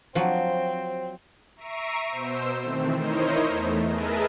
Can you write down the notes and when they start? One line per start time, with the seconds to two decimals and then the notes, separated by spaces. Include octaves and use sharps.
0.15 F3 F#3 C4
1.56 E5 A#5 C#6 C7 D7 D#7
2.09 B2 C5 E6
2.61 D#3 E3 A3 C4
2.96 D#4 E4 A#4 C5 C#5 D#5
3.48 E2 A3
3.89 G#4 A#4 B4 D#5 E5 A5